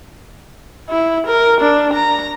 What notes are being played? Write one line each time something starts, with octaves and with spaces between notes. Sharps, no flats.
E4
A#4
D4
A#5